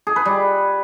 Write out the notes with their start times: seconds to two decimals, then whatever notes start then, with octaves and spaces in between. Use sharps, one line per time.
0.07 G#4
0.16 B4
0.25 G3